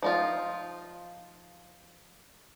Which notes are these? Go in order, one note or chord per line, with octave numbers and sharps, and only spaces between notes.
F3 D#4 F4